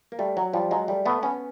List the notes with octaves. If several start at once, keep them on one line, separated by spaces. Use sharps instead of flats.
A#3
G3 A3
F#3
F3 G3
F#3 G#3
G3 A3
A3 B3
B3 C#4